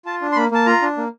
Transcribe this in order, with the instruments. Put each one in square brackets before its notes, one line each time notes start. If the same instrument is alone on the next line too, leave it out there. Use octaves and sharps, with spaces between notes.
[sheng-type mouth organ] F4 A5
D4
C6
A#3 B5
A#3 A5
F4 A#5
D4
A#3